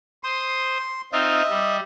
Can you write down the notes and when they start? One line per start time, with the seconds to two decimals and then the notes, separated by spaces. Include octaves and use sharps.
0.24 C5 C6 D#6
1.13 C4 D#4 F4 D#5 E5
1.50 G3